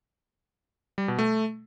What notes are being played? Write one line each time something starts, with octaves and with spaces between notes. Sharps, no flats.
G3
B2
A3